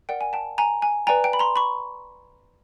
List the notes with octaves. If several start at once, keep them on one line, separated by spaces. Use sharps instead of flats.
A#4 D5 F#5 G5
G#5
G5 A5
G#5 A#5
G#5
B4 D5 G5 G#5 A#5
G5
B5
A#5 C6
B5 C#6